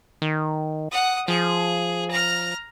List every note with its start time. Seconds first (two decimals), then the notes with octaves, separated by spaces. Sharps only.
0.22 D#3
0.91 F#5 D#6
1.28 F3 G#4
2.11 A#5 F6